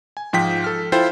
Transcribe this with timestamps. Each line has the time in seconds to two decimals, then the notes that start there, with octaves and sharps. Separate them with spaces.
0.17 G#5
0.33 G#2 F3 G5 B6
0.64 A4 F6
0.92 E4 F4 A4 C5 G5